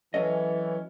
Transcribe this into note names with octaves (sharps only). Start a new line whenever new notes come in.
E3 F#3 C#4 A4 C#5 D#5